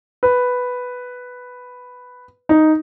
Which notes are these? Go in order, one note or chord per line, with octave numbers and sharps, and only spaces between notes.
B4
D#4